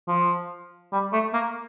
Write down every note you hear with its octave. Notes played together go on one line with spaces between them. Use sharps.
F3
G3
A3
A#3